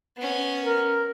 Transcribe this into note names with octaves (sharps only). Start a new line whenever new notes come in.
B3 C#4
A#4